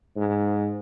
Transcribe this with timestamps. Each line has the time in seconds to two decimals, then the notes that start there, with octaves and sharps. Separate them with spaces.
0.17 G#2